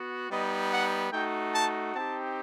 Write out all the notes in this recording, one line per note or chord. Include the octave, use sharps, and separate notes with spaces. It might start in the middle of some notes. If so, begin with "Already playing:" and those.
Already playing: B3 F#4
G3 B3 D#4 D#5
F#5
A3 D#4 F#4 G5
A5
C4 D#4 G4 A5